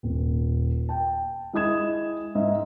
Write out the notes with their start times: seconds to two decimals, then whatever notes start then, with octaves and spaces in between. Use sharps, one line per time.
0.03 D#1
0.89 G5 A5
1.53 G#3 E4 D#5 D#6 G#6 E7
2.35 G#2 D#4 D#5 E5